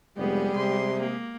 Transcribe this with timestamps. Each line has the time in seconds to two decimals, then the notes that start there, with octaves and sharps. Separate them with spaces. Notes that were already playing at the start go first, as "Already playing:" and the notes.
0.17 F1 G3 G#3 B3 G4 G#4
0.56 C3 C6
1.00 A#3